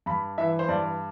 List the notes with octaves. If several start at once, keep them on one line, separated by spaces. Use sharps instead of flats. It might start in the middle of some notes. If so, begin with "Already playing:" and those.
G2 B5
E3 E5
C5
G2 D5